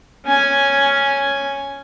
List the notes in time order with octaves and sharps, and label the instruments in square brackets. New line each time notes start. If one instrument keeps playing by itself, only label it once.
[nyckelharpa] C#4 G#5